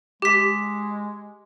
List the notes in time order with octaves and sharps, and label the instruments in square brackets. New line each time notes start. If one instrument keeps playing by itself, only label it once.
[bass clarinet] G#3 [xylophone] G4 B6